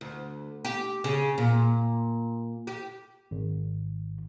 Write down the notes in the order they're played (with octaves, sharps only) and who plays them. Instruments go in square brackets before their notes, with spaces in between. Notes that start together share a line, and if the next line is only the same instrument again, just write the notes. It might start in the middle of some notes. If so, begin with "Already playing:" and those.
[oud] D2
G4
C#3
A#2
G4
[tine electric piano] G#1